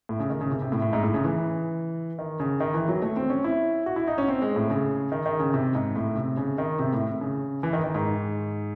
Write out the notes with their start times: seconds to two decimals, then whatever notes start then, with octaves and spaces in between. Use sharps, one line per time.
0.09 A2
0.20 C#3
0.30 D#3
0.41 C#3
0.51 C3
0.62 C3
0.72 A2
0.82 A2
0.93 G#2
1.04 A2
1.14 C#3
1.24 E3
2.19 D#3
2.40 C#3
2.60 D#3
2.74 E3
2.89 F#3
3.02 A3
3.16 C4
3.30 C#4
3.44 E4
3.86 F#4
3.96 E4
4.07 D#4
4.18 C#4
4.28 C4
4.42 G#3
4.56 A2
4.70 C#3
5.12 D#3
5.26 D#3
5.40 C#3
5.54 C3
5.75 G#2
5.96 A2
6.16 C3
6.37 C#3
6.58 D#3
6.79 C3
6.93 A2
7.21 C#3
7.63 E3
7.73 D#3
7.84 D#3
7.95 G#2